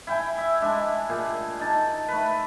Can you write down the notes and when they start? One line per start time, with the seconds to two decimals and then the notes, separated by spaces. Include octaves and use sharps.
0.07 E4 G5 G#5
0.38 E5
0.61 G#3 D4 E5
1.09 A#2 G4 G#4
1.60 D#4 A5
2.08 A3 B4